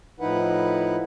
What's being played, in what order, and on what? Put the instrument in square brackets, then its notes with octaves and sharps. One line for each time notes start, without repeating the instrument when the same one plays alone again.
[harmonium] A2 F3 D#4 E4 B4 F#5